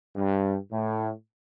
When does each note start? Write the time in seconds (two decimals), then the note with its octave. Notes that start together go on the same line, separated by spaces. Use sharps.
0.15 G2
0.71 A2